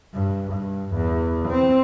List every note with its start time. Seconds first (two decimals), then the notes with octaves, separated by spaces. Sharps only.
0.13 G2
0.53 G2
0.95 E2
1.48 C4